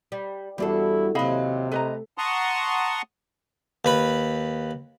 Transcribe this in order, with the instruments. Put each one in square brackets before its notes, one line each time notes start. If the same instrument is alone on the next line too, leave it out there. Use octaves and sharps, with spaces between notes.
[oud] G3
[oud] E2 D4 A4 [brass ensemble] G3 E4 F#4
[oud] D#2 F#3 [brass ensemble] C3 [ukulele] D#5 F5 B5
[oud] A3 [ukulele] B4 D#5 A#5
[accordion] F#5 A5 A#5 C6 C#6 D#6
[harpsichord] D#2 B4 B5